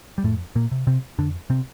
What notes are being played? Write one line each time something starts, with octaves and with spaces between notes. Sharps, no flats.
G3
F2 A2 A3
A#2 A#3
C3
C3 C4
F2 D3 D4
C3 C4